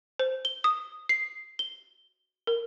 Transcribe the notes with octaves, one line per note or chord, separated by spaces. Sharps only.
C5
G7
D#6
C7
G7
A#4